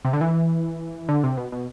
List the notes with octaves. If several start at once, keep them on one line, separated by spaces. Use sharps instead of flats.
C3
D3
E3
D3
C3
B2
B2